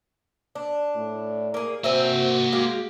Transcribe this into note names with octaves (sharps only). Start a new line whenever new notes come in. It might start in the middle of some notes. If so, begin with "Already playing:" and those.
D4
A2
A#3 G#4
A#3 C4 F#4 E5 G#5
G#3 G4 F5